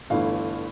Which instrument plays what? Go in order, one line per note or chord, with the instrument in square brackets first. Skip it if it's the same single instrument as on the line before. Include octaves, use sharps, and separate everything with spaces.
[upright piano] G1 G2 E3 A3 F5